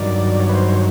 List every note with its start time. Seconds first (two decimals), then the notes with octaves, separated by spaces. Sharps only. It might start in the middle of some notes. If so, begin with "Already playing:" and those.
Already playing: G2 D#3 F#3 D5
0.40 C#5
0.49 B4
0.55 C5
0.69 C#5